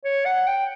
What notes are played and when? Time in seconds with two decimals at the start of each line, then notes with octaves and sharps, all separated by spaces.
0.05 C#5
0.26 F#5
0.47 G5